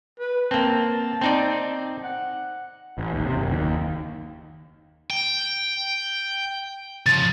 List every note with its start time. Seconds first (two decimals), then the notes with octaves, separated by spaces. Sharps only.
0.19 B4
0.51 A#3 C4 A5
1.21 C4 D#4 D5
2.04 F#5
2.98 A1
3.12 D#2
3.25 C3
3.37 F#1
3.52 D#2
5.10 G5
7.06 C#3 F3 A6